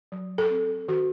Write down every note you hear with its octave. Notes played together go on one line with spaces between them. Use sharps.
F#3
A4
C4
D#3 F#4